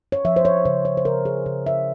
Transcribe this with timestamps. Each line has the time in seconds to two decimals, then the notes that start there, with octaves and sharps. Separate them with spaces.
0.12 C#5
0.25 F3 E5
0.36 C5
0.45 C#5
0.65 C#3 C5
0.85 C#5
0.97 C5
1.05 C#3 A#4
1.25 G#4
1.46 C#3 G#4
1.66 E5